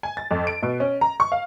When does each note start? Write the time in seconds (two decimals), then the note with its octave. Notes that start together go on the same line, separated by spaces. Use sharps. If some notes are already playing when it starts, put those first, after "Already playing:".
0.03 G#5
0.17 A6
0.31 F2
0.47 D7
0.63 B2
0.80 C#4
1.01 A#5
1.20 C#6
1.32 F5